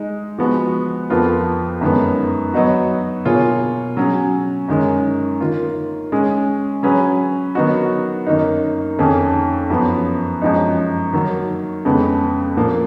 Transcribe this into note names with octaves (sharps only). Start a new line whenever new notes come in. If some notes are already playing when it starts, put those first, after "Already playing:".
Already playing: G#3 D#4
F3 G#3 B3 F#4
F2 F3 B3 F4 A#4
F#2 D#3 G#3 B3
F#3 B3 D#4 F#4
B2 A#3 F4 G#4 C#5
F#3 C#4 G#4
F#2 D#3 G#3 C#4
D#3 A#3 F4
G#3 C#4 G#4
F#3 C#4 G#4 B4
D#3 F#3 B3 D#4 F#4
F#2 D#3 A#3 D#4
F2 D#3 A#3 C#4 G#4
F#2 F3 B3
F#2 F3 G#3 D#4
D#3 F#3 A#3
F2 C#3 G#3 B3
A#2 F3 A#3